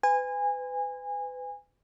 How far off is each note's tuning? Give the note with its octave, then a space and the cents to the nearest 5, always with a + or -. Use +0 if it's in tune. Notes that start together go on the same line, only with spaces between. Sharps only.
B4 +35 G#5 -25